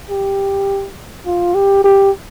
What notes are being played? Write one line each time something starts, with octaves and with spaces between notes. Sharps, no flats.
G4
F4
G4
G4